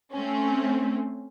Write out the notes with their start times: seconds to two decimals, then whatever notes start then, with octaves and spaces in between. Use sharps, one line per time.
0.13 A3 C4 C#4